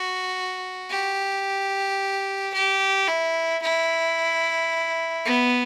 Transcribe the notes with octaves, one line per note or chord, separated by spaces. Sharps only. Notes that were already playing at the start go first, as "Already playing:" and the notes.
Already playing: F#4
G4
G4
E4
E4
B3